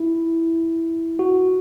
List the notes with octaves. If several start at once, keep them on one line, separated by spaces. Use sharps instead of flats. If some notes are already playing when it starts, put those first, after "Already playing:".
Already playing: E4
F#4